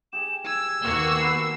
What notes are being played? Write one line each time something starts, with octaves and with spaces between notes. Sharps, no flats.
G4 G#4 G#5 E7
E6 G#6
D#2 B2 A#3 F#4 G4
A#4 B4 G#5 C7